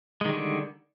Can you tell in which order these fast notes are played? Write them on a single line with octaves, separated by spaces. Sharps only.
G#3 D#3 G3 D3